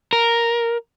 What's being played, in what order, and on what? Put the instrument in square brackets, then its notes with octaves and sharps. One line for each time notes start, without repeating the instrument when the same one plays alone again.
[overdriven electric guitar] A#4